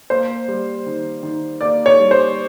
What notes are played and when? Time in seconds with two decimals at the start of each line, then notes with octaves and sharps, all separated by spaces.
0.10 A#3 C5
0.48 G3
0.86 D#3
1.23 D#3
1.61 A#3 D5
1.86 C#5
1.99 G3
2.11 C5